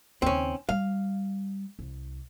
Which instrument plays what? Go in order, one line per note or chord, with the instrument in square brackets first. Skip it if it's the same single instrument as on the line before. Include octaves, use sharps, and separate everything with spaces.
[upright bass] D#2 C#3 [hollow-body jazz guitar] C4 C#4
[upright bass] G3 [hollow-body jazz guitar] F5
[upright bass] C2